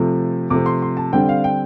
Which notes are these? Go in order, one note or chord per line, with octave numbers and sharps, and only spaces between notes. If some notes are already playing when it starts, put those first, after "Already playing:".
Already playing: C3 F3 A3
C3 F3 A3 C4 D6
C6
C6
A5
D3 G3 C4 G5
F5
G5